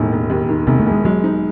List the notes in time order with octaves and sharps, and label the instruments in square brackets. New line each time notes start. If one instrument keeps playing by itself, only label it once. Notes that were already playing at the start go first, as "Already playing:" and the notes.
Already playing: [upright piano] E1 D#2 D#3 [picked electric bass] A2
[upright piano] E1
D#2
D#3
[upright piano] E1 [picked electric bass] C3
[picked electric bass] A3
[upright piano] E1
[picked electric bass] G#3
[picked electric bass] F#3 [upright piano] G#3
[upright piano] D#4